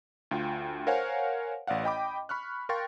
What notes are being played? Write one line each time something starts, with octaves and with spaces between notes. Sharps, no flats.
D2 F4 G5
A#4 C5 C#5 F5 F#5 G#5
A1 D5 F5 F#5
D#5 G5 B5 D6
B5 C#6 F6 F#6
A#4 F5 G5 C6 C#6 A6